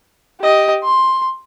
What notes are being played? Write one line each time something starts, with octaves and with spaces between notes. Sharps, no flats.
G4 D#5
C6